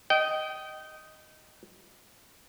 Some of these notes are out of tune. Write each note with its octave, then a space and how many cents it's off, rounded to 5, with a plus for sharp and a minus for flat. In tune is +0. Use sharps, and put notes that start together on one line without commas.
D#5 +5 G5 -25